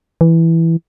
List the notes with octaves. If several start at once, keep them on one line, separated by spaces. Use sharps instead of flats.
E3